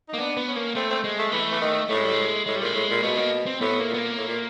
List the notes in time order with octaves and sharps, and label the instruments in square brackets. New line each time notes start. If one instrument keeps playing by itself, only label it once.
[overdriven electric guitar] A#3 [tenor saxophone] D#4
[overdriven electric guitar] B3 [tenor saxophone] D4
[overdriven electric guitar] B3
[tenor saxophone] C#4
[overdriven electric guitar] A#3
[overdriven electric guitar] A3 [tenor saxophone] C4
[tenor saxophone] C4
[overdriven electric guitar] G#3
[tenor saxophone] A3
[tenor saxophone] E3 [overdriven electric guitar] A3
[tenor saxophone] E3
D#3
[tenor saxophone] A2 [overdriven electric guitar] A3
[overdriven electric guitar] G#3
G3
G#3
[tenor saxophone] A2 [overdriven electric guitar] G#3
[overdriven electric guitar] G3
[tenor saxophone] A#2 [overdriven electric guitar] G#3
[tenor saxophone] A2
A#2
[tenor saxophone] B2 [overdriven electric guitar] A3
[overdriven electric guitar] A#3
C4
[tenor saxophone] A2 [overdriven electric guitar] B3
[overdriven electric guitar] A#3
[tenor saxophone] A#2 [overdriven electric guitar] B3
[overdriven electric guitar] A#3
[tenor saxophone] A2
A#2